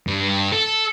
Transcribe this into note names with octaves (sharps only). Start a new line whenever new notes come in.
G2
A4